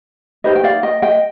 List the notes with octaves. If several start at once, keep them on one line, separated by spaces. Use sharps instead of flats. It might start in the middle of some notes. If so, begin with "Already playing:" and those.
D#4 G4 B4 C5 D#5
G5
D5 F5
D#5 G5
D#5 G5